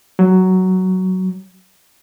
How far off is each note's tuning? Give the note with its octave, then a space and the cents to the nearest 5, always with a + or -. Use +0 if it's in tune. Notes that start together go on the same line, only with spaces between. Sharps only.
F#3 +10